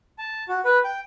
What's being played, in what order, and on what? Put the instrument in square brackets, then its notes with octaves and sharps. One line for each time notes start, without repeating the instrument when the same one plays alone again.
[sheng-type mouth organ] A5
F#4
B4
G5